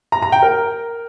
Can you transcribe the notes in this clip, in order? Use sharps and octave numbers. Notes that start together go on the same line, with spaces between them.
A#5
A#5
G5
A#4